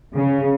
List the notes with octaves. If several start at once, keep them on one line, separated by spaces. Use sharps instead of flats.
C#3